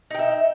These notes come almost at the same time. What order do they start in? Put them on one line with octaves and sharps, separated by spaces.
D#4 G5 E5